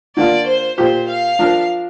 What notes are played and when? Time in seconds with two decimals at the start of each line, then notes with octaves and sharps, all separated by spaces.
0.16 D3 A#3 F4 D5
0.47 C5
0.78 A#2 A#3 G4 C5
1.09 F5
1.39 F3 D4 A#4